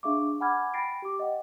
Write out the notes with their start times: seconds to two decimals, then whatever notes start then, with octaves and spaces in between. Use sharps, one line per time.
0.03 D4 G#4 E5 F5 C#6 D6
0.40 F#5 G#5 B5 D6 F6 G#6
0.74 G5 B5 A6 A#6 C7 D7
1.02 G4 D6
1.19 D#5 F#5 G5